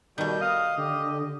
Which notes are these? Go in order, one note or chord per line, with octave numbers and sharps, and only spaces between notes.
B2 D#3 G3 A3 G6
D#5 F5 D#6
D3 G4